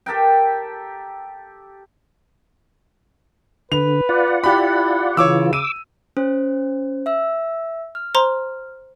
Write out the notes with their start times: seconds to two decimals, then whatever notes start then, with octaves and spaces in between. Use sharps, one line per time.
0.06 G4 A4 A#4 G5
3.72 D3 B4 F7
4.09 F4 D5 F#5
4.44 E4 G4 B5
5.17 C#3 E3 F4 C#5 D6 E6
5.53 D6 E6 D#7
6.17 C#4 C5
7.06 E5 E6
7.95 F6
8.15 C5 A#5 C6